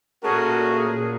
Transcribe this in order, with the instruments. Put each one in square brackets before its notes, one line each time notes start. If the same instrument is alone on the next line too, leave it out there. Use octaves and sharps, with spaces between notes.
[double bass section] A#2 [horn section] A3 C#4 F#4 [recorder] G#4 [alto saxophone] A#4